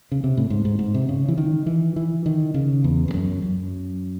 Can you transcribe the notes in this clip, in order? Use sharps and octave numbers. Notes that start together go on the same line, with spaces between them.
C#3
C3
A2
G#2
G#2
G#2
C3
C#3
E3
D#3
E3
E3
D#3
C#3
E2
E2
F#2
F#2